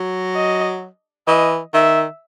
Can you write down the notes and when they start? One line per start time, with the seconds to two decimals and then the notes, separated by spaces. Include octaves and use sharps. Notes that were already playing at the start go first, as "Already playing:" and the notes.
Already playing: F#3
0.35 D#5
1.27 E3 D#5
1.74 D#3 E5